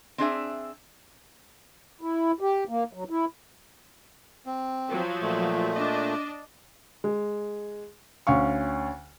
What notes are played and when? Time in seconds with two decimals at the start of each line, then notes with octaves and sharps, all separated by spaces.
0.18 C4 D4 G#4 E5
2.01 E4
2.40 G4
2.69 A#3
2.93 F#3
3.10 E4
4.46 C4
4.89 F3 F#3
5.22 A#2 A3
5.72 D4 D#5
7.04 G#3
8.27 D2 C#4 F5 C#6